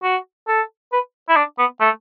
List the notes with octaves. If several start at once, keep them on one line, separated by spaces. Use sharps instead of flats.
F#4
A4
B4
E4
D4
B3
A3